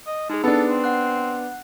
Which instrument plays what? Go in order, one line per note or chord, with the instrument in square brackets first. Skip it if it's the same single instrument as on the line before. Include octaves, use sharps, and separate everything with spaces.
[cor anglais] D#5
[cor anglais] G#3 [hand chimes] D#4 G#4
[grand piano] B3 D4 [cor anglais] A4
[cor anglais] C4
[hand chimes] F#5 F#6